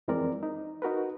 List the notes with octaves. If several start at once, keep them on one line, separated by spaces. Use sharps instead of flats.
F2 E3 G#3 C4 A#4 D5
D#4
D#4 F#4 A#4 B4